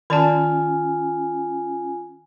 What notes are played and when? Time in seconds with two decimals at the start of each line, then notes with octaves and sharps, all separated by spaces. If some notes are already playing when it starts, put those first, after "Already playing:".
0.10 D#3 C#4 F4 D5 G#5 A5